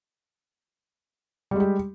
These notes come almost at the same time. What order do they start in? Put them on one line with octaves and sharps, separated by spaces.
G3 G#3 G4